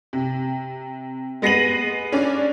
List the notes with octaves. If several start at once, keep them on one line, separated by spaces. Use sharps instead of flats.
C3
G#3 B3 A#6 C7 D#7 F#7
C#4 D4 D5